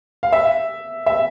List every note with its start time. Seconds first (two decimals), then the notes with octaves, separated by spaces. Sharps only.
0.23 F5
0.32 E5
1.06 E5